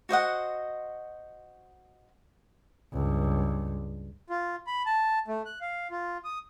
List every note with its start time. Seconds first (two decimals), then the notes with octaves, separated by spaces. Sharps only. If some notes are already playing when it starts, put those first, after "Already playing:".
0.09 F#4 C5 D#5 F#5
2.93 C#2 G2
4.30 F4
4.67 B5
4.86 A5
5.28 A3
5.45 F#6
5.61 F5
5.91 F4
6.24 D#6